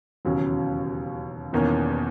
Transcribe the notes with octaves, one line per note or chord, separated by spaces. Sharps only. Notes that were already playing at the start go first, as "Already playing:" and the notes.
E1 D#2 C#3 F#3 C#4
E1 E2 D#3 A#3 C#4